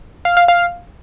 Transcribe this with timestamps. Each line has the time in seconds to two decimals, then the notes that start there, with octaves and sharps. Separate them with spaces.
0.25 F5
0.37 F5
0.48 F5